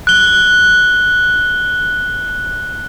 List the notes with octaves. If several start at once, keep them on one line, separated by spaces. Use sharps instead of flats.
F#6 G7